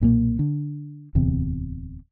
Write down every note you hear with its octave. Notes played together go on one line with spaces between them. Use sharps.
B1 A#2 F3 A#3
D3
D1 E2 C3